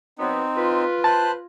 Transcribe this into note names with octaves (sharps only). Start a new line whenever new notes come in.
F#3 B3 C4 D#4
F4 B4
C5 A5 F#6